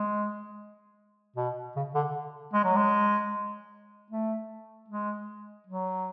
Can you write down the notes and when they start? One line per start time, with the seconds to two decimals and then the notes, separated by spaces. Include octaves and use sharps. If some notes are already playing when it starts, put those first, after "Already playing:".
Already playing: G#3
1.36 B2
1.76 C#3
1.95 D3
2.54 G#3
2.65 F#3
2.76 G#3
4.11 A3
4.89 G#3
5.67 F#3